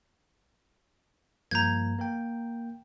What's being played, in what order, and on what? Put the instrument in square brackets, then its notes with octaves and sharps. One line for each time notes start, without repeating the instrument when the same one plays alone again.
[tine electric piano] G2 F3 A#3 [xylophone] A#5 G6 G#6
[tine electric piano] A#3 A#4 G5